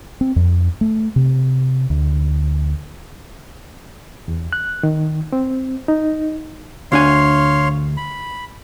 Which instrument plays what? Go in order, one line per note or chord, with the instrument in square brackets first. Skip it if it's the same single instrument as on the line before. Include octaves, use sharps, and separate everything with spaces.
[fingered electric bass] C4
F2
A3
C3
D2
[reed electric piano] E2
F#6
D#3
C4
D#4
[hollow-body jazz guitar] D2 D4 G#5 [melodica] C#5 F5 C6
[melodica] B5